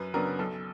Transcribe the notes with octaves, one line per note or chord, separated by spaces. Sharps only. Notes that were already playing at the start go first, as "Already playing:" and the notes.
Already playing: F#2 B4
C#3 F#3 B3 D4 A#4
B1 A4